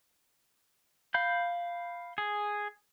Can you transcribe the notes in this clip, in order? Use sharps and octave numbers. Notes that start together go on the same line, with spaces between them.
F5 B5 G6
G#4